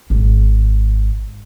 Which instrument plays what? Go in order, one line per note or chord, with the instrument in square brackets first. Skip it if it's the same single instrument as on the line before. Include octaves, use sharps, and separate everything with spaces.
[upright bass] G#1